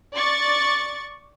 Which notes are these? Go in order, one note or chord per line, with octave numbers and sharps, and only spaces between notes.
D5 C#6 A6